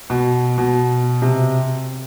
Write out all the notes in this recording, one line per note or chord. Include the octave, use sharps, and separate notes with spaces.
B2
B2
C3